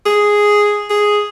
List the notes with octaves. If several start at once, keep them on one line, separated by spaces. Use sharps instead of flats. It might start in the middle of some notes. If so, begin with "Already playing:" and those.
G#4
G#4